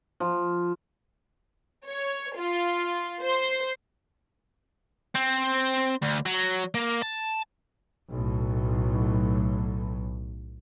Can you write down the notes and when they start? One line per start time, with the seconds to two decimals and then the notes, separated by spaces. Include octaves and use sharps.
0.20 F3
1.88 C#5
2.37 F4
3.22 C5
5.15 C4
6.02 D2
6.26 F#3
6.74 A#3
7.02 A5
8.10 B1 A2